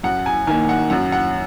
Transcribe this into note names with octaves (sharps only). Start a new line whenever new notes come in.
F#2 F#5
G#5
D#3 A#3 G#5
F#5
F#2 F#5
F#5